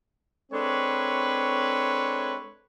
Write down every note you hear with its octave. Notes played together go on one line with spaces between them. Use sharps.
G#3 C4 D4 A4 B4 C#5